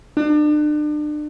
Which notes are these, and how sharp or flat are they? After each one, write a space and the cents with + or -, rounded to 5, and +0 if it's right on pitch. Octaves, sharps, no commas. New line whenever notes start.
D4 +35